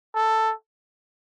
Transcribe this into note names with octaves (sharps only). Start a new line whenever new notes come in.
A4